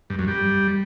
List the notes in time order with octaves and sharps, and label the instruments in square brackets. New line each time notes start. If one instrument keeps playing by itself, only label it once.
[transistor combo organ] G2
F#2
G3